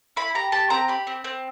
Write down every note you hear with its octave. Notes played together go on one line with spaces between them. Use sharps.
E4 B5
G4 A#5
G4 A5
C4 A#5
G4 B5
C4
C4